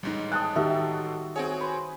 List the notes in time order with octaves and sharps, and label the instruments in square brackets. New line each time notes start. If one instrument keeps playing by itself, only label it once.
[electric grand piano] A1 G#2 [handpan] G3 D#4
[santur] G5 A5 D#6 [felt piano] F#6
[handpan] D#3 D#4 G4 [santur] F#4 A4 [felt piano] E5
[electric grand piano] C4 F#4 C#5 [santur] G#4
[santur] B4 C5